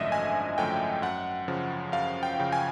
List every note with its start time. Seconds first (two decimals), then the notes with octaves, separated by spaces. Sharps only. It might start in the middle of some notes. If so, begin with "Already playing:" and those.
Already playing: G#1 F#2 D3 F3 A3 D#5 E5
0.12 G#1 G#5
0.58 F#2 D3 F3 A3 G5
1.02 F#2 F#5
1.48 C#3 F3
1.92 F#2 F5
2.23 G5
2.38 C#3 F3
2.52 G#5